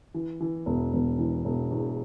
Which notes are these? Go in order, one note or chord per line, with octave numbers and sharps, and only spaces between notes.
E3
E3
E1
E1
E3
E1
E2